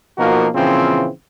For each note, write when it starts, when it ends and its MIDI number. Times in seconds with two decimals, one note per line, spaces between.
0.18 0.48 47
0.18 0.48 53
0.18 0.48 58
0.18 0.48 63
0.18 0.48 66
0.18 0.48 70
0.55 1.07 46
0.55 1.07 49
0.55 1.07 52
0.55 1.07 53
0.55 1.07 60